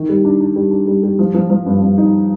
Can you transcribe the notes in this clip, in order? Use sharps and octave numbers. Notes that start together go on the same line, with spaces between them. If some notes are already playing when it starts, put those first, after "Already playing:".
Already playing: D#3
G3
D4
D4
G3
D4
G3
G3
F3
F3
F3
G2
G2
D#4